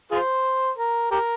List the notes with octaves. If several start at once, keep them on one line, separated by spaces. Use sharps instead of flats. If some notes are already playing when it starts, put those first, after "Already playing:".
F4 G#4 C5
A#4
G4 A#4